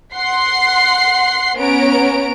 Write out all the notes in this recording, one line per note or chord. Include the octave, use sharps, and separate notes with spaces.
F#5 C6 C7
B3 C#4 C#5 A#5 D7